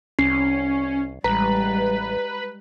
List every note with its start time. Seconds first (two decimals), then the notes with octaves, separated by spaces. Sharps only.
0.19 C2 C#4 C7
1.24 A1 G3 G#3 B4 A#5